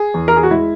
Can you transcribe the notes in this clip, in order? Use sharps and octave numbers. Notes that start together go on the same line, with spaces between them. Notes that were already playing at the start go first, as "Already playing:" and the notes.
Already playing: G#4
E2
A#4
G#4
F#4
G#3 E4